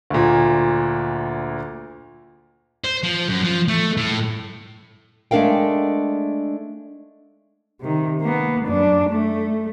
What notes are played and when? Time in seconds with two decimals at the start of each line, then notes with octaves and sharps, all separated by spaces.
0.10 D2 A#2
2.84 C5
3.03 F3
3.29 F#2
3.44 F3
3.68 A3
3.97 A2
5.31 G#3 A3 D4 A#4 F5 G5
7.81 C3 D#3
8.22 A#3 B3
8.66 F#2 D4
9.10 A3